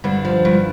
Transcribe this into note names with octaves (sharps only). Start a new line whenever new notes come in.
G2 D3 D4
F3
G2